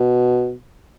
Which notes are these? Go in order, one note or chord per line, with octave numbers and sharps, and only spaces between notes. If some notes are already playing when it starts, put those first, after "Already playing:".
Already playing: B2